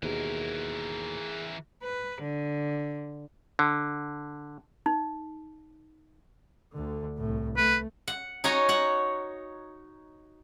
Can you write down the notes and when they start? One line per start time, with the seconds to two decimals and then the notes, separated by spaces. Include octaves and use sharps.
0.03 D#2 B2 E3 G#4 A#4
1.83 B4
2.22 D3
3.59 D3
4.86 D#4
6.73 D2 D3
7.18 C2 A2
7.57 A3 B4
8.08 F#5
8.44 D#4 F#4 C#5 G#5 A#5
8.69 C#5 F#5